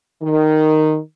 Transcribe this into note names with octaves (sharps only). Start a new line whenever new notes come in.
D#3